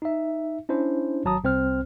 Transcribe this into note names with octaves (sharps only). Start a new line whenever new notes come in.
D#4 E5
C#4 D4 E4 C5
G#1 F#3 A5 A#5 D#6
C2 C4 C5 F6